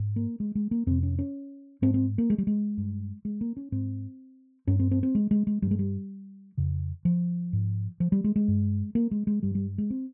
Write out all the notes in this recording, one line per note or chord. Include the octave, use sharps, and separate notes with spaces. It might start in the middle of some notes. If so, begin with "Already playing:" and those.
Already playing: G#2
A#3
G#3
G#3
A#3
F2 C3 C4
C#4
C#4
G#2 C4
C4
A#3
G#3
G3
G#3
G2
G#3
A#3
C#4
G#2 C4
G2 C#4
C4
C4
C4
G#3
G#3
G#3
G2 G3
G#3
G3
F2 C#3
F3
G#2
F3
G3
G#3
G#3
G2
A#3
G#3
G#3
G2 G3
G3
G#3
C4